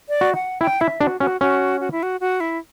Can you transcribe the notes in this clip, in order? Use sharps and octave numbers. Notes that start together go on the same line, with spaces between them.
D5
F#4
F#5
E4 G5
E4 E5
D4 F#4
C#4 F#4
C#4 F#4
F#4
E4
F#4
F#4
E4